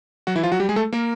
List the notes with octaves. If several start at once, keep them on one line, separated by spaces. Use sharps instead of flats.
F#3 F#4
E3 E4
F3 F4
F#3 F#4
G3 G4
G#3 G#4
A3 A4
A#3 A#4